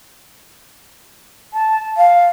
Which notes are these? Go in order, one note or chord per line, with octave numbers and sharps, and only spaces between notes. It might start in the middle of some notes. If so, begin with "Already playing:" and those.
A5
F5